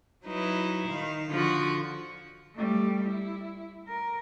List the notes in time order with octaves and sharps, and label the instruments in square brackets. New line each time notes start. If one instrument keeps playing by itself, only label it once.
[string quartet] F#3 D#4 E4 B4
D#3 F5
D3 F3 F#4
[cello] G3 A3
E4
A#4